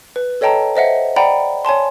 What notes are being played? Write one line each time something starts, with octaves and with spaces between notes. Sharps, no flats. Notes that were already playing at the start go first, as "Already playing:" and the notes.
B4
A4 C#5 D#5 G5 A5 A#5
C5 D#5 E5 F#5
D5 F#5 G5 A#5 B5
C#5 G#5 A5 C6